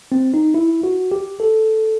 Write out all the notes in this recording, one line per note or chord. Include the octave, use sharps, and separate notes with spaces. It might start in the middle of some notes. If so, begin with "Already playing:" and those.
C4
D#4
E4
F#4
G4
A4